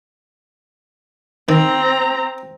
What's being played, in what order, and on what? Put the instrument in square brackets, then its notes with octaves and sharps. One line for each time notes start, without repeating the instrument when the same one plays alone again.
[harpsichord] D#3 [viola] C4 A#5